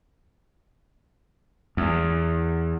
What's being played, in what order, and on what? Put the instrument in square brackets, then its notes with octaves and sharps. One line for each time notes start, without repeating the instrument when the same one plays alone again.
[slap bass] E2